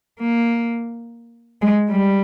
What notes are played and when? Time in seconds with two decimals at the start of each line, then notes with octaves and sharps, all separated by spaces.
0.20 A#3
1.62 G#3
1.90 G3